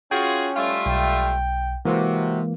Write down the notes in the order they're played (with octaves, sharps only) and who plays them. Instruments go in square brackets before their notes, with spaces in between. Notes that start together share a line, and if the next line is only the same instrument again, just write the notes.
[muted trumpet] C#4 [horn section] F4 F#4 G#4 [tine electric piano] G5
[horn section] G3 A3 F4
[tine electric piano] B1 [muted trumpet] G5
[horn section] C3 [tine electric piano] E3 G#3 A#3 [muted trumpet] F#4